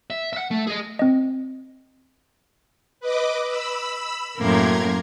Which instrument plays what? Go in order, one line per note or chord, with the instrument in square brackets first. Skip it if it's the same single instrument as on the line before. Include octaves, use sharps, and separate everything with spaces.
[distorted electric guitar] E5
E5 F#5
A3
G#4 D#5
[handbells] C4 D#5
[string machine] B4 D#5 D6
B5 E6
[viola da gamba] F#2 A2 A#3 [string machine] A#5 C6 G#6